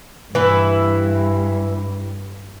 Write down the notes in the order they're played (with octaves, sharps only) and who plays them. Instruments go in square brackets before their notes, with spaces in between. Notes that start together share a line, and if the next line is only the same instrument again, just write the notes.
[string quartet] G2 [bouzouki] E3 E4